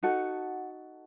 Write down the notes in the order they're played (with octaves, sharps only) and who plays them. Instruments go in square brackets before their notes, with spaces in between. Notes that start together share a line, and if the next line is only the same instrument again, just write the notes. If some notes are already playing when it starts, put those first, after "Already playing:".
[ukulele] D#4 F#4 A4 F#5